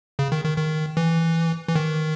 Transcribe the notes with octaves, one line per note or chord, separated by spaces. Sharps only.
C#3
D#3
D#3
D#3
E3
E3
D#3